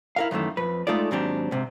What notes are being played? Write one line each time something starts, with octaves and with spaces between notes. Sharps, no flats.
E4 A#4 F5
F#2 D#3 E3 A3
F2 B4
G#3 A3 D#4 F4 A4 D5
D#2 G#2 F#3 C4 D4 G4
G#2 C3